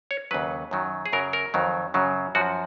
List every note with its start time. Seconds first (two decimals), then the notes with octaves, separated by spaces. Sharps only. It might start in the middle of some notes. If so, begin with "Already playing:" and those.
0.11 C#5
0.31 D#2 C#3 F#3 B4
0.71 F#2 D#3 F#3
1.06 G#4
1.13 F#2 C#3 F#3 A#4
1.33 A#4
1.54 F2 D#3 F#3
1.94 F#2 C#3 F#3
2.35 F#2 F3 F#4